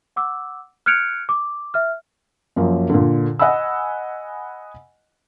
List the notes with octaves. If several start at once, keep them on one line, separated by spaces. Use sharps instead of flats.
F#5 D6 E6
F6 F#6 G#6 C#7 D7 F7
D6
E5 F6
F#2 F3 F#3 A#3
A#2 D3
D#5 F#5 G#5 B5 E6